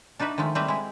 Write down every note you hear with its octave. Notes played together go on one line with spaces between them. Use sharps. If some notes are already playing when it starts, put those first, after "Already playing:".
D4 D#4 F#4 B4 E5
D#3 F3 G#3 A3
G3 A3 C4 B4 D#5 E5
G#3 E4